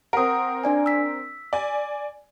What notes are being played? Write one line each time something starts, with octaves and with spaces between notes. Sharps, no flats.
C4 A#4 F#5 D#6
D4 D5 G#5
E6 B6
D5 G#5